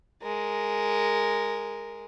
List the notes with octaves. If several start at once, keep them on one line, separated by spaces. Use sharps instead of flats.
G#3 A#4